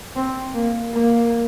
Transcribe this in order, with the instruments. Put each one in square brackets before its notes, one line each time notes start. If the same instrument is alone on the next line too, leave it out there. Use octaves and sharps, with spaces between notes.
[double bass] C4
A#3
A#3